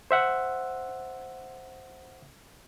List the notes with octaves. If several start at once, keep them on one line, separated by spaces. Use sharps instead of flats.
C5 E5 F#5